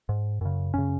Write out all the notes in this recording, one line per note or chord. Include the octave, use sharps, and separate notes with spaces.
G#2
F#2 C#3
F#2 C#3 C#4